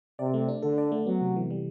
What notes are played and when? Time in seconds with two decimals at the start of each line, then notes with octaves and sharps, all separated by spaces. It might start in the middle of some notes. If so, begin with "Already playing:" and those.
0.19 C3 D5
0.34 A3
0.48 D4
0.63 D3 A4
0.78 D5
0.92 A3
1.06 F#3 B3
1.21 C3
1.36 E3
1.51 G3